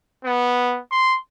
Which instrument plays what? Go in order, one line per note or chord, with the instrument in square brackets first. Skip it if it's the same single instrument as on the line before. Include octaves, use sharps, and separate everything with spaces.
[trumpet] B3
C6